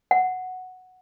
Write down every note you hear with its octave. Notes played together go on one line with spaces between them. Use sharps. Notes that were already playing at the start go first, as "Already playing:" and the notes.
F#5